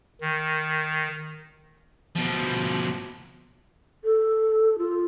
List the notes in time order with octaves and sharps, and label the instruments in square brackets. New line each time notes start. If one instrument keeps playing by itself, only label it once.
[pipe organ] D#3
[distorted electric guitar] B2 F3
[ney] A4
F4